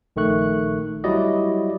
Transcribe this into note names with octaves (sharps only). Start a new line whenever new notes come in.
A#1 D#3 A3 C#6 F#6
F#3 G3 E4 F#4 D5 D#5